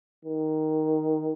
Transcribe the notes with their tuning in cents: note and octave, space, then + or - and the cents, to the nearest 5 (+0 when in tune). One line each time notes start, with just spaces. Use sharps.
D#3 +5